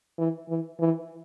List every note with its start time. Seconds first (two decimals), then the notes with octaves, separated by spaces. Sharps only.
0.19 E3
0.49 E3
0.80 E3